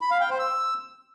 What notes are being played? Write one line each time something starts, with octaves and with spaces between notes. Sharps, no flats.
B5
F5
G5
C5
E6